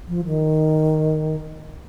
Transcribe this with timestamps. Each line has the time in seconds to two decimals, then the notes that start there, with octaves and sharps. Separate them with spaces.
0.08 F3
0.25 D#3